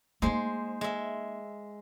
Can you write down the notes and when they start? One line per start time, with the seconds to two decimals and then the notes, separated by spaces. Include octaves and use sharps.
0.22 G#3 A#3 D#4 C5
0.81 G#3 E5